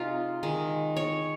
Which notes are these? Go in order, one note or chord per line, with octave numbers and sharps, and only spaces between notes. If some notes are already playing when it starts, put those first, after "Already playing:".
Already playing: C3 G#3 D#4 F4
D#3 G#3
C#5